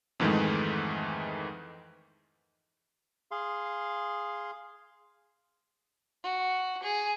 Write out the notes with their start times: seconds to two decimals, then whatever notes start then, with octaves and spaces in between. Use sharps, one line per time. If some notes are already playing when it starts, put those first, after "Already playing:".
0.20 F2 G#2 D#3 E3 G#3 A3
3.31 G#4 F5 C6
6.24 F#4
6.83 G#4